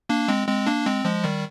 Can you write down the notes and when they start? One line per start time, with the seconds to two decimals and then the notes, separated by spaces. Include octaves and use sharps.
0.09 A#3 D4
0.28 G#3 C4
0.48 G#3 C4
0.67 A#3 D4
0.86 G#3 C4
1.05 F3 G#3
1.24 D#3 G3